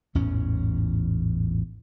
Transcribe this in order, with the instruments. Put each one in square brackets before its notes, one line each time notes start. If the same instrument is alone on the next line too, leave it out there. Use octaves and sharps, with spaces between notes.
[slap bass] A1 E2 G#2 C#4